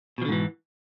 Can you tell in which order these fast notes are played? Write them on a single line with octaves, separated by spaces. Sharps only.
B2 F3 D3 G#2 E3